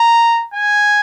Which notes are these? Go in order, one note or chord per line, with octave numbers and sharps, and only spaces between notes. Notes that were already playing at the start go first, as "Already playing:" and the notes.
Already playing: A#5
G#5